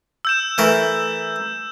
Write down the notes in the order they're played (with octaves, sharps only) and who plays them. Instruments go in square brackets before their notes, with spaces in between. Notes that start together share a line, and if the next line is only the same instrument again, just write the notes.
[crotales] E6 G6 E7
[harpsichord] E3 A3 A#4